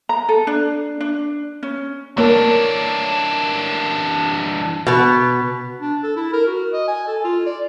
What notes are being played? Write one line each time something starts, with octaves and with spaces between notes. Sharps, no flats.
A#5
A4
D4
D4
C#4
E3 A#3 D4 C#5
B2 B3
D4
A4
E4
A#4
F#4
D#5
G#5
A4
F4
D5